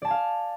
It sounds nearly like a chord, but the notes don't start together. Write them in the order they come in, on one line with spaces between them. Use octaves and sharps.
D5 A5 G#5 F5